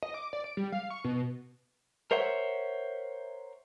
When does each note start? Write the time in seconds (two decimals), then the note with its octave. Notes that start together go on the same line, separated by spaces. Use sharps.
0.03 D#5
0.14 D6
0.33 D5
0.44 D7
0.57 G3
0.72 F5
0.90 C#6
1.05 B2
2.11 A#4 C5 C#5 E5 F#5